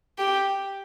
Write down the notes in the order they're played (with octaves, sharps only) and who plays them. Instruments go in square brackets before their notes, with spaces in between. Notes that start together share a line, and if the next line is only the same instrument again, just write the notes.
[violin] G4